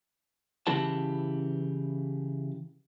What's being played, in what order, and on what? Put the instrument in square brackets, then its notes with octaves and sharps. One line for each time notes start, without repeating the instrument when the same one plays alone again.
[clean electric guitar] C#3 E3 E4 G4 B4 A5